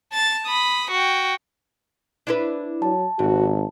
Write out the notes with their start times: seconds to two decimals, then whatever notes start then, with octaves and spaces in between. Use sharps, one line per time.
0.12 A5 A6
0.47 B5 D#6
0.91 F#4 G5
2.27 D4 E4 B4
2.82 F#3 A5
3.19 G#1 G#2 F#4